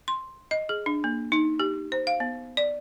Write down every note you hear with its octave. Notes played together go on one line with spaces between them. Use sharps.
C6
D#5
G#4
D4
A#3
D#4
G4
C5
F5
B3
D5